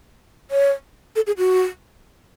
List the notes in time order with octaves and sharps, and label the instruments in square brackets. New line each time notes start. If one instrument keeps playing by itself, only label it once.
[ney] C#5
A4
G#4
F#4